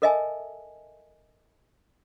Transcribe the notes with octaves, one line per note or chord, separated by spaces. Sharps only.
A4 A#4 D#5 E5 G#5 A5